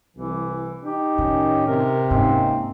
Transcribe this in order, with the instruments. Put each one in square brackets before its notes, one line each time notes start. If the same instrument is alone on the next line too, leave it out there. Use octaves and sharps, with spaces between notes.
[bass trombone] C2 [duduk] E3
[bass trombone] D#4 [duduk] G4
[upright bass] A2 [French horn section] D#3 C#4
[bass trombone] C3 [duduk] A#4
[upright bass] G#2 [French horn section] A#3 C#4 D#4 [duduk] C4